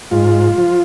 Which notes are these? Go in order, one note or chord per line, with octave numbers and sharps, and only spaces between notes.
G#2 F4
F3